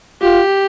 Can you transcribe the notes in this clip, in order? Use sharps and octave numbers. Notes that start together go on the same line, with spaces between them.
F4 G4